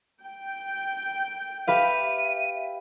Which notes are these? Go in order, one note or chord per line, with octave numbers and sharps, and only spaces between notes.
G5
G4 B4 E5 F5 D#7